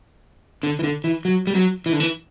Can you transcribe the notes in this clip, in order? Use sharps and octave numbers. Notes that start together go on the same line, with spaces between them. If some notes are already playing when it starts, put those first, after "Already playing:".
D3
E3
D3
E3
F#3
G3
F#3
E3
D3
E3